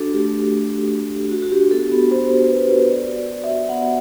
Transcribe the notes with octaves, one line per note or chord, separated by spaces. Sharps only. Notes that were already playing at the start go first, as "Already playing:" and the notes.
Already playing: D4 F#4 A4
A3 G4
A3
F#4
F#4
A3
F#4
F#4
F#4
D4 G4
B3 A4
B3
B3 C5
B3
B3 B4
B3 C5
F#4 D5
F#4
D5
F#4
E5
F#4
B3 F#5